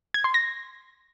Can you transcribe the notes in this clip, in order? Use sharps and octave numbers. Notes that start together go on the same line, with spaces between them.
G#6
C6
A#6